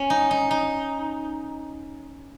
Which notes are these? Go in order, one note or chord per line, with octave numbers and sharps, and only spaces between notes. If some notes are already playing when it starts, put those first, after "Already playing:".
Already playing: C#4
D#4
D#4
D#4